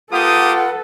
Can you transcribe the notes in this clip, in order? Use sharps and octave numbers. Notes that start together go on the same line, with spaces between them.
A#3 F4 G4 A4 B4 F#5 D#6